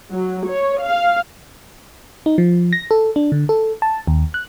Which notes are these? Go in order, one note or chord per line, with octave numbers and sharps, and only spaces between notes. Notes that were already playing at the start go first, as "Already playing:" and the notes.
F#3
C#5
F5
D#4
F3
A#6
A4
D4
D3
A4
A5
D#2
F#6